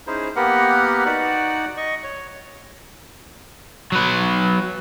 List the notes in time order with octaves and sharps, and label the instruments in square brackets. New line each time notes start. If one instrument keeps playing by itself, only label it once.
[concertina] C#4 D#4 E4 G#4 C5
A#3 B3 G4 A#4 B4 F#5
D#4 F#4 D5 F#5
D#5 C#6
C#5
[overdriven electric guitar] F#3 B4